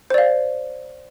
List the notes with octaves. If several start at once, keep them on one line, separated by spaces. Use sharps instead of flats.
C5 D5 F5